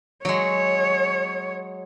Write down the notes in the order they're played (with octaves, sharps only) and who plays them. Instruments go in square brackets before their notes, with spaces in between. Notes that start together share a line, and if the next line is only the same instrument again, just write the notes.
[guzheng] F#3 G#3 [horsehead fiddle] C#5